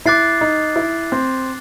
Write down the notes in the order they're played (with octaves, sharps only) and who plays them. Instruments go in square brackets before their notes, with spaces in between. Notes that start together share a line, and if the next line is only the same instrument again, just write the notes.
[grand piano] E4 [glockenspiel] D6 F#6 A6 C7
[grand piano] D#4
E4
C4